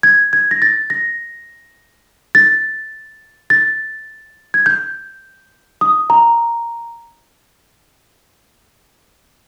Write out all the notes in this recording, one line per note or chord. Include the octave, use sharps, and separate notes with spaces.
G#6
G#6
A#6
A6
A#6
A6
A6
G#6
G6
D#6
A#5